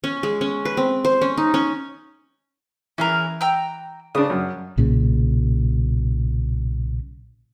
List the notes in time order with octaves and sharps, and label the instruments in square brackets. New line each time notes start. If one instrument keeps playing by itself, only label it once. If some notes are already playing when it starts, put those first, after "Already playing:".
[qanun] C#4
G#3
C#4
B4
C4
C5
C#4
D#4
C#4
[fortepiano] E3 [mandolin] C#4 G#4 A#4
[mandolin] G5 A#5 E6
[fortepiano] C#3 D4 [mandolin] D#6
[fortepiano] F#2
[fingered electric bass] B1 A#2 C#3